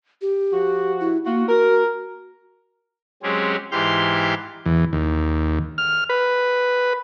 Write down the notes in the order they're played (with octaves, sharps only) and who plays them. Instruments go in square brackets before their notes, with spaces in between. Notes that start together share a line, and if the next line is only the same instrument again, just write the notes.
[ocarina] G4
[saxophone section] F3 F#4
[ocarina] E4
[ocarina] A#3 [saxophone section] F4 F#4
[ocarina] F#4 [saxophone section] A#4
[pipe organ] F#3 G#3 C4 C#4 G4 G#4
G#2 E3 G4 C6 F6 G6
[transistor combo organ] E2
D#2
F6
B4